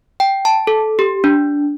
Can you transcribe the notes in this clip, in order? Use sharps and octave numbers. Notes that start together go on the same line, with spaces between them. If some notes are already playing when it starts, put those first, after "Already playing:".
G5
A5
A4
G4
D4